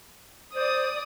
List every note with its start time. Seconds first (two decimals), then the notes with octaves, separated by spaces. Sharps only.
0.55 C5 D5 D#6